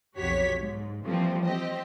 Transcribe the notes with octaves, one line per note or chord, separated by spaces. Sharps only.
B1 F2 F#4 G4 C#5 B6
G#2
E3 F3 G3 A3 A#3 C4
C4 G4 C5 D#5